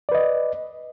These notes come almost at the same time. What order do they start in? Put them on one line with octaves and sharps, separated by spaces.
D5 B4 D#5